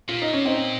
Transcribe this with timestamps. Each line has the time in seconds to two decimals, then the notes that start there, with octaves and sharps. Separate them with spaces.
0.09 A#2 F4
0.22 D#4
0.33 C#4
0.45 C4 D#4